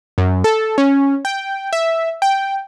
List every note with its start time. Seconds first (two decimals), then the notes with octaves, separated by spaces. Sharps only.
0.18 F#2
0.44 A4
0.78 C#4
1.25 G5
1.73 E5
2.22 G5